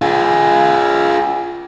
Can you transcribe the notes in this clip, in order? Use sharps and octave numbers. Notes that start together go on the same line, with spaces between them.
F4 G#4